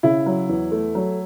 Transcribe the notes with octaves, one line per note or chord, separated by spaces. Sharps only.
C#3 E4
F#3
E2
A3
F#3